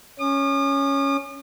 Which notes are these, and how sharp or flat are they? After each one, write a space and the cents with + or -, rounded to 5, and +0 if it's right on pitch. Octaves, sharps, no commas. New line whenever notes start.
C#4 +0 D#6 -45